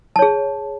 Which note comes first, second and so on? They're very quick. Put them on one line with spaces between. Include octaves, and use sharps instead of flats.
A5 C#5 G#4